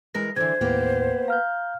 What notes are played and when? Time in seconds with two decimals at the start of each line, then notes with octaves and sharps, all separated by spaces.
0.14 E3 G#3 A#4 A#6
0.36 D3 E3 C5 G#6
0.61 D#2 A2 A#3 B3 G4
1.28 F5 A#5 F6 G6